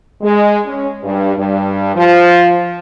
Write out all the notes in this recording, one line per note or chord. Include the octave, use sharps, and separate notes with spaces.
G#3
C#4
G2
G2
F3